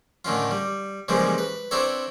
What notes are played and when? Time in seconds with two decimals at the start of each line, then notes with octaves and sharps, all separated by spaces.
0.25 A2 D3 D#3 C#4 F4
0.51 G3
1.08 C#3 E3 F3 G3 G#3 A#3
1.38 B4
1.71 C4 D4 E4 A4 C#5